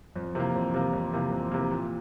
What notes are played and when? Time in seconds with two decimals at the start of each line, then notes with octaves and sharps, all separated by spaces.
0.16 F2
0.35 C3 E3 A#3
0.55 F2
0.74 C3 E3 A#3
0.93 F2
1.13 C3 E3 A#3
1.32 F2
1.51 C3 E3 A#3
1.71 A#2